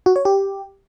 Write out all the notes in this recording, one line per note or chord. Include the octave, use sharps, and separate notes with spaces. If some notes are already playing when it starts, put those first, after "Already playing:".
F#4
C#5
G4